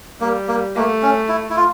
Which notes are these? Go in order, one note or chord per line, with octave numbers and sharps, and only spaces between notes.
G3 A#3
A#3
A3 A#3
C#4
E4
E4
F4